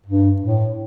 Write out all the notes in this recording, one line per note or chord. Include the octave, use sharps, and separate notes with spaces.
G2
A2